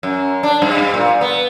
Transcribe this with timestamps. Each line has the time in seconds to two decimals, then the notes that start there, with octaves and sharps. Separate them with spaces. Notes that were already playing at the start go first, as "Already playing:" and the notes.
0.03 F#2
0.43 D4
0.62 G2
0.94 A#2
1.21 B3